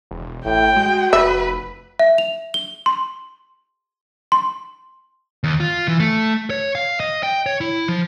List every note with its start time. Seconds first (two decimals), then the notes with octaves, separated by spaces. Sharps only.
0.11 E1
0.45 A1 A2 G5
0.76 G#3 F#4
1.13 F1 B4 E5
1.99 E5
2.18 F7
2.54 G7
2.86 C6
4.32 C6
5.44 D#2
5.60 F4
5.88 E3
6.00 A3
6.50 C#5
6.75 F5
7.00 D#5
7.23 G5
7.46 C#5
7.61 E4
7.88 F3